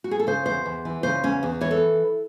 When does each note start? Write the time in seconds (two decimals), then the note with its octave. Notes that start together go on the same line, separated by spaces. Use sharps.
0.04 F#4
0.11 G#4
0.20 A4
0.27 C#3 C5
0.46 E2 C5
0.66 E2
0.85 E3
1.03 C#3 C5
1.23 E2 C#4
1.43 E2
1.61 E3 C#5
1.71 A4